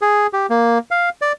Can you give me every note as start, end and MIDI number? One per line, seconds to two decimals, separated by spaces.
0.02 0.27 68
0.33 0.46 67
0.50 0.78 58
0.91 1.09 77
1.22 1.32 74